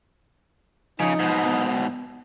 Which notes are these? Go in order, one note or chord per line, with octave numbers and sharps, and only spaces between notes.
C#3 F3 D#4 C#5
G#2 B2
B3